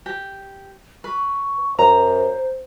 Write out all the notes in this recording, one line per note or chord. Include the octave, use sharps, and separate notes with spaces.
G4
B4 C#6
F#2 C5 A#5